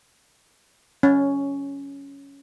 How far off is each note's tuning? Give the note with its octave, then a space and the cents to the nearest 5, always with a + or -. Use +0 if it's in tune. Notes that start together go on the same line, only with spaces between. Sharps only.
C#4 +10